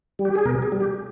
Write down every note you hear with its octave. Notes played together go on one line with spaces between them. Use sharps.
G3
G4
G#4
B2 A#4
G#4
G3
G4